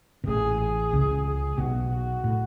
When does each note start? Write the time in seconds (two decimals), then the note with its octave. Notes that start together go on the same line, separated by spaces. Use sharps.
0.24 B2
0.27 A1 A2 G#4
0.61 G#4
0.93 C#2 C#3
1.26 G#4
1.58 B1 B2 F#4
1.91 F#4
2.24 A2